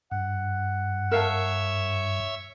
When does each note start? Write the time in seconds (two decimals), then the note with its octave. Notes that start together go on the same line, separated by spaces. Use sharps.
0.11 G2 F#5
1.11 A#4 C#5 E5 F5 A5 E6